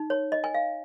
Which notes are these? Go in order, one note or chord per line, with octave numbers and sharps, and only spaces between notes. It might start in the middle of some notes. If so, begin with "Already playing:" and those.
Already playing: D#4
C#5
D#5
G#5
F5